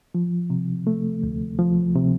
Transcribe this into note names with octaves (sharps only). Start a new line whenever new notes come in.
F3
C3
A3
D2
F3
C3